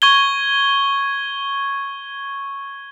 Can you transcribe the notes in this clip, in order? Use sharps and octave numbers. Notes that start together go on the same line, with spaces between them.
C#6 G#6 G7